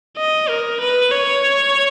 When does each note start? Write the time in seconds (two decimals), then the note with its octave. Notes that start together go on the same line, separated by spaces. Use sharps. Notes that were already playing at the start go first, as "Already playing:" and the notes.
0.17 D#5
0.49 A#4
0.80 B4
1.12 C#5